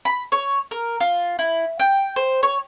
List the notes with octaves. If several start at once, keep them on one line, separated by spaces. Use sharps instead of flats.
B5
C#5
A#4
F4
E4
G5
C5
C#5